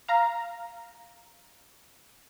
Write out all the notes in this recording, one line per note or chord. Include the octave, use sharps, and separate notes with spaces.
F5 A#5